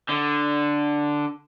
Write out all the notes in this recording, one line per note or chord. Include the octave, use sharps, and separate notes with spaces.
D3